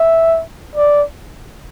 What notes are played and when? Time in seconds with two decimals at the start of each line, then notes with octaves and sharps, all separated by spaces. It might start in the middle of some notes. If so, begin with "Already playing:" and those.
Already playing: E5
0.76 D5